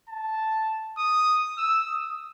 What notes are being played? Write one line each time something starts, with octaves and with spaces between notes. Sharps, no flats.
A5
D#6
E6
D#6